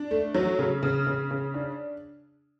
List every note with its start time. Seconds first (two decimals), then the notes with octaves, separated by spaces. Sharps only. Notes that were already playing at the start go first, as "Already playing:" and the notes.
Already playing: D4
0.11 A3
0.34 F#3
0.59 C#3
0.83 C#3
1.07 C#3
1.31 C#3
1.54 D4